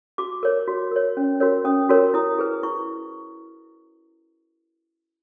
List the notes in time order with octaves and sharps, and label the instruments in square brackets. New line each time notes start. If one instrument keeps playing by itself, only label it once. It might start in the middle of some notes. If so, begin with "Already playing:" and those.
[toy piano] F#4 D6
A#4 C#5
F#4
A#4 C#5
C#4
F#4 A#4 C#5
C#4 D#6
F#4 A#4 C#5
E4 D#6
G#4 B4
E4 C#6